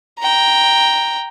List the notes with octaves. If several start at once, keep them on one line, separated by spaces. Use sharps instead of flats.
G5 A#5